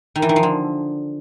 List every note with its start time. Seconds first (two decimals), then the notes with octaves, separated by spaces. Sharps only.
0.16 D#3
0.22 E3
0.29 D#3
0.36 F3
0.43 D3